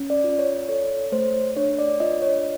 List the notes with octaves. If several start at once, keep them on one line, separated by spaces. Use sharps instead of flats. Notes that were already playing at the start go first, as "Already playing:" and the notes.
Already playing: C#4
D5
F4
C#5
A4 C#5
A3 C5
D4 C#5
D5
F4 D#5
C#5